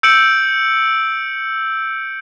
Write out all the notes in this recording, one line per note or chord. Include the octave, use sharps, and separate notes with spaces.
E6 G6 C#7 D7 F#7